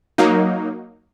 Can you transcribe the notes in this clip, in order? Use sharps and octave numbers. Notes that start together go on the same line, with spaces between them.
F#3 A#3 D#4